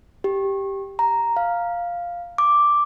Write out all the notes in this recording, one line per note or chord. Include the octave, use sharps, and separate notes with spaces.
G4
A#5
F5
D6